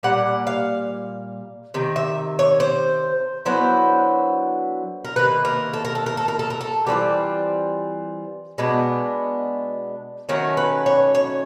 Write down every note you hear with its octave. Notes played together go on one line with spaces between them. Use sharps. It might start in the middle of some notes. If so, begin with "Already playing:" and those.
A#2 G3 F#5
F5
C3 D#3
E5
C#5
C5
D3 F#3 B3 E4 C5
A#4
C3 D#3 A#3 B4
A#4
A4
A#4
A4
A#4
A4
A#4
A4
A#4
A4
E3 G3 C4 F4 G4
B2 G#3 B3 D4
D#3 F#3 A3 C#4 A#4
B4
C#5
C#5